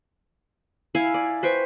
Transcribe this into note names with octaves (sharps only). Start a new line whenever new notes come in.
E4 F5 G#5
D5
B4 C5 G5 C#6